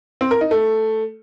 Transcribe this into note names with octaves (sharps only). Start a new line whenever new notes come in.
C4
A#4
D#4
A3